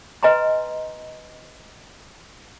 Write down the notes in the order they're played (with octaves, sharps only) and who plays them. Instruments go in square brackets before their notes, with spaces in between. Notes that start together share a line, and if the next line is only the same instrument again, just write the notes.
[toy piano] B4 D#5 G#5 A#5 C6